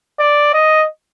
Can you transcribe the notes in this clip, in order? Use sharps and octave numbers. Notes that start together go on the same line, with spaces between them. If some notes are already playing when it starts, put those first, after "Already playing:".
D5
D#5